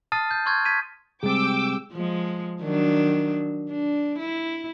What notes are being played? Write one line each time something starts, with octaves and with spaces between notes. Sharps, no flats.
A5 D#6 F6 A6 C7 D#7
G6
C6 C#6 F6 G6 G#6
G#6 B6 D#7
C3 G3 G#3 C4 G#4 G5 D6 E6
F3 G#3
D#3 F#3 D4
D4
E4